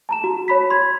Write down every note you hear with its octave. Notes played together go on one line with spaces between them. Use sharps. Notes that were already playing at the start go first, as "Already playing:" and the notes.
A5 A#5 E7
F#4
C#5 B5 B6
C6 G#6